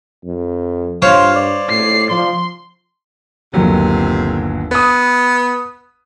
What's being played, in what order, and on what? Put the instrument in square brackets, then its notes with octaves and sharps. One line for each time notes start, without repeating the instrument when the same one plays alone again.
[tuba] F2
[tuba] G2 [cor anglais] F4 [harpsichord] C5 C#5 F5
[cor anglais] D5
[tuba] A2 [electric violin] C7
[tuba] F3 [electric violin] C6
[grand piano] G1 D#2 F#3 [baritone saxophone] C3
[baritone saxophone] B3 [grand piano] B4 D#6